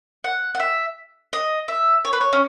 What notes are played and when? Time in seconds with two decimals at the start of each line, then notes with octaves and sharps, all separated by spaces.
0.24 F#5
0.55 F#5
0.60 E5
1.33 D#5
1.68 E5
2.05 C#5
2.13 B4
2.21 C#5
2.33 C#4